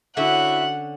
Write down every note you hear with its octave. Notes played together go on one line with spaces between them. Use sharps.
D3 C#4 E4 F#4 E5 F#5